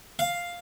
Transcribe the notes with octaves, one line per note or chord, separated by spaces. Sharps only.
F5